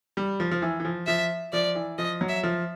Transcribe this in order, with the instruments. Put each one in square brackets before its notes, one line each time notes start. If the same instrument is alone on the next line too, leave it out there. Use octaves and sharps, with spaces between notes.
[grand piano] G3
F3
F3
E3
E3
F3
[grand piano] F3 [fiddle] E5
[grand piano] F3 [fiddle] D5
[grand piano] E3
[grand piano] F3 [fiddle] D#5
[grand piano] F#3
[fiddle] E5
[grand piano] F3